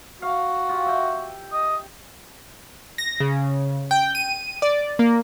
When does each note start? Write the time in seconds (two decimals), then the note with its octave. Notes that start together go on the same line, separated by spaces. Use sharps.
0.22 F#4 F5
0.69 F4 G4
0.86 E5 G5
1.53 D#5
2.98 A#6
3.20 C#3
3.91 G5
4.15 D#7
4.62 D5
4.99 A#3